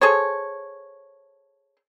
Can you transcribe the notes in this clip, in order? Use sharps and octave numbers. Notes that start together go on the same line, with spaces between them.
G#4 A4 C5 C#5